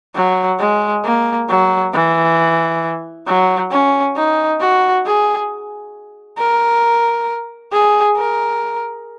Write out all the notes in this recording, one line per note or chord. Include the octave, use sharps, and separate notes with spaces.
F#3
G#3
A#3
F#3
E3
F#3
C#4
D#4
F#4
G#4
A#4
G#4
A#4